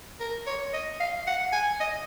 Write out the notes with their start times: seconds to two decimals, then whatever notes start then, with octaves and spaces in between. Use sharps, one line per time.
0.20 A#4
0.47 C#5
0.74 D#5
1.00 F5
1.27 F#5
1.53 G#5
1.81 D#5